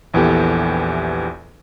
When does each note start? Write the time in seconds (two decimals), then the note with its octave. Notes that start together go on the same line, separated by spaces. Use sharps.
0.14 A#1 E2 E3 B3 G4 A4